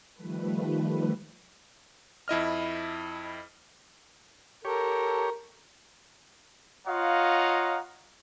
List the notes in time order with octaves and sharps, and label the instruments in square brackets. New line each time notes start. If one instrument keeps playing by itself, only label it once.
[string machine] D#3 F3 G3 A3 B4
[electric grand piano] F2 E4 D#5 F6
[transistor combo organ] G4 C#5 [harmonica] A4 A#4
[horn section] F4 C#5 D#5 F5 F#5 A#5